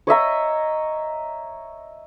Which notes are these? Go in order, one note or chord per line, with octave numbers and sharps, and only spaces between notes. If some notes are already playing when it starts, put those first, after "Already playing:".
C#5 D#5 E5 A#5